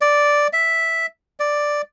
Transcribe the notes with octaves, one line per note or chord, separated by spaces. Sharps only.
D5
E5
D5